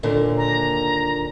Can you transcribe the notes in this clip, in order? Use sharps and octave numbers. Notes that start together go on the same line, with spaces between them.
D#2 A#2 D3
A#5